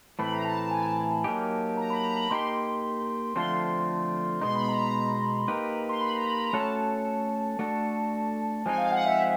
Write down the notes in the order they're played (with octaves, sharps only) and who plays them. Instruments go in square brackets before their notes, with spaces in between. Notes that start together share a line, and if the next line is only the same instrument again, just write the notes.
[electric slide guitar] A2 E3 A3 C4 [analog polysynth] B5
[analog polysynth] A#5
A5
A5
G#5
A5
[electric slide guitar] F#3 A#3 D#4 G4
[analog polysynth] A#5
B5
A#5
B5
[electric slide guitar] A#3 D#4 G4 [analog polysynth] C6
[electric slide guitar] D3 F3 A3 C4 F4 [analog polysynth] C6
[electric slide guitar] B2 G#3 B3 D#4 [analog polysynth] C6
[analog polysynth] B5
A#5
A#5
A#5
[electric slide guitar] A#3 D#4 G4 B4
[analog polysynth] C6
B5
A#5
B5
A#5
[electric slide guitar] A3 C#4 F#4 A4 C#5 [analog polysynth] A5
[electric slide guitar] A3 D4 F#4 A4
[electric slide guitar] F3 G#3 C4 D#4 [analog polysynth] G#5
[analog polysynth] F5
F#5
E5